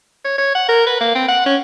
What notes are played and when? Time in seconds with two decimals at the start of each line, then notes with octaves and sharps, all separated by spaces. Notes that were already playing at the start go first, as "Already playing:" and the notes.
0.25 C#5
0.38 C#5
0.55 F#5
0.69 A#4
0.87 B4
1.01 A#3
1.15 C4
1.28 F#5
1.46 C#4